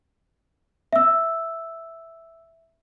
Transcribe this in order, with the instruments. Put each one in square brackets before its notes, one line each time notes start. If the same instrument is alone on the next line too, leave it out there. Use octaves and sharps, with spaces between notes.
[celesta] E5 E6